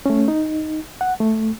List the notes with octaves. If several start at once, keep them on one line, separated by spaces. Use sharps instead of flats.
A3 C#4
D#4
F#5
A3